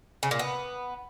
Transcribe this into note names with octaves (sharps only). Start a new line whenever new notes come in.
C#3
A#2
B3